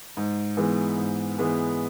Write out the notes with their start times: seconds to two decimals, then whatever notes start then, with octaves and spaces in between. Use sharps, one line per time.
0.17 G#2
0.57 E3 G#3 B3
0.98 G#2
1.38 E3 G#3 B3